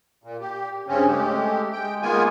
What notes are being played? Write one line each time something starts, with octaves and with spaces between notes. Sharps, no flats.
A#2
G4
G2 C#3 C4 C#4
G#3 A3 G4
G#3 G5
D#3 G#3 A#3 B3 F4 G#5